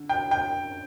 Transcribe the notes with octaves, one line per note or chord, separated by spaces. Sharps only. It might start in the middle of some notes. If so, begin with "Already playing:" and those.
Already playing: D3
G5
G5